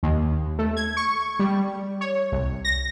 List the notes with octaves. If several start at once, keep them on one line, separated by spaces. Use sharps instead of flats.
D#2
A3
G#6
C#6
G3
C#5
C2
A#6